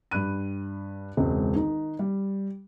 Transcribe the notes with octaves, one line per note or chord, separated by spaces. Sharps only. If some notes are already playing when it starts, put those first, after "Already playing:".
G2 B5 F#6 D#7
E1 C#2 C4
D#3 D#4
G3